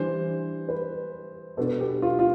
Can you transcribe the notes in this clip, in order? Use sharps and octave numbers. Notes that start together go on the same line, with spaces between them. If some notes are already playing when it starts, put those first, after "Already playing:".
Already playing: E3 G3 D4 C5
B4
B2 B3 D4 A4
G4
F4
F4